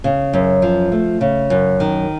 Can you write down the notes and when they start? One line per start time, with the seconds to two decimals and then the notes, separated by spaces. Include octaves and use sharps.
0.04 C#3
0.33 F#2
0.62 F3
0.92 A3
1.21 C#3
1.50 F#2
1.80 D#3